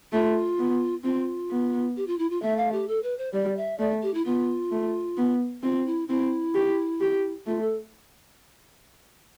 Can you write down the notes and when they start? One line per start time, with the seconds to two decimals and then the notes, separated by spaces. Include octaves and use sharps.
0.12 A3 F4
0.58 B3
1.04 C4 F4
1.50 B3
1.96 G4
2.07 F4
2.18 E4
2.30 F4
2.42 A3 E5
2.57 F5
2.72 G4
2.88 A4
3.03 B4
3.18 C5
3.33 G3 D5
3.57 E5
3.79 A3 D5
4.02 G4
4.14 E4
4.25 B3 F4
4.71 A3
5.17 B3
5.63 C4 F4
5.86 E4
6.08 C4 E4
6.55 G4
7.00 G4
7.46 A3 F4
7.61 A4